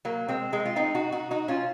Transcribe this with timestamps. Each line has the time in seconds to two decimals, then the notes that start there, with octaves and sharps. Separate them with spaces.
0.05 F#3 A#3
0.29 G#3 C4
0.52 G#3 C4
0.66 F4
0.76 C4 D#4
0.95 D#4 F#4
1.12 D#4 F#4
1.31 D#4 F#4
1.48 C#4 F4